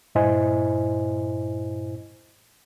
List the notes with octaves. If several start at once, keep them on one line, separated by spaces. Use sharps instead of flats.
G2 A#2 E4 C5 D#5 G#5